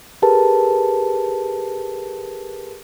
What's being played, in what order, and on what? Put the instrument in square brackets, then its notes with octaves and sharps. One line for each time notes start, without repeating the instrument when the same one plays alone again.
[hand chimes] G4 G#4 A#4 B4 A5